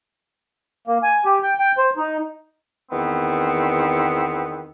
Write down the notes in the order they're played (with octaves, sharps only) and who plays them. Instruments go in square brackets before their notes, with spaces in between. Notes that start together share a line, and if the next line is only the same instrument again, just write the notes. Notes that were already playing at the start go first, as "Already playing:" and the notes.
[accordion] A#3
G#5
G4
G5
G5
C5
D#4
[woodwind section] E2 D#3 B3 C4